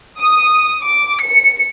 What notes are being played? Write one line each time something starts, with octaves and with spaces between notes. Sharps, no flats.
D#6
D6
C#7